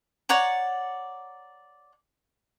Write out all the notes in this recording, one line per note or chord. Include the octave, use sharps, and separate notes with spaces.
C#5 D5 F#5 A#5